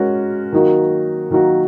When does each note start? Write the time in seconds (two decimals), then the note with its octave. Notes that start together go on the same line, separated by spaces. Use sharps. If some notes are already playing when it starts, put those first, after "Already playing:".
Already playing: G#3 C#4 F#4 A#4
0.53 D#3 F#3 A#3 D#4 F#4
1.31 D#3 F#3 A#3 D#4 F#4